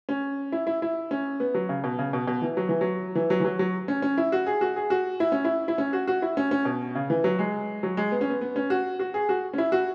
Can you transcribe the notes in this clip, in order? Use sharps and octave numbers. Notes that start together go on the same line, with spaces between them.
C#4
E4
E4
E4
C#4
B3
F#3
C#3
B2
C#3
B2
B2
E3
F#3
E3
F#3
E3
F#3
E3
F#3
F#3
C#4
C#4
E4
F#4
G#4
F#4
G#4
F#4
E4
C#4
E4
E4
C#4
F#4
F#4
E4
C#4
C#4
B2
C#3
E3
F#3
G#3
F#3
G#3
B3
C#4
B3
B3
C#4
F#4
F#4
G#4
F#4
C#4
E4
F#4